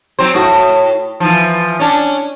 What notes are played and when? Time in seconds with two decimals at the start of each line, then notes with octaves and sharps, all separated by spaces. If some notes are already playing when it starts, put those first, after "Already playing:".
0.19 F#3 C4 C5
0.34 A2 F#4
1.20 E3 F3
1.80 C#4 D4